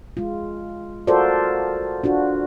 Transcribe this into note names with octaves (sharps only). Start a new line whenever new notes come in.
G#3 F4
F4 F#4 A4 A#4 C5 D5
D4 F4 F#4